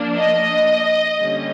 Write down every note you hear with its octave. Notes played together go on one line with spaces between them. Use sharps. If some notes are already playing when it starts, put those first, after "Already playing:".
Already playing: F3 A#3 D4
D#5
D3 G3 A#3 C#4